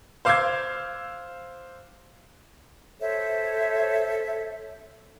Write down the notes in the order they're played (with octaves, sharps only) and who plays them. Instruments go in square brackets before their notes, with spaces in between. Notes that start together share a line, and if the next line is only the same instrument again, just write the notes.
[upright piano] C5 F5 D6 E6 G6 G#6
[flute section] A4 C5 C#5 E5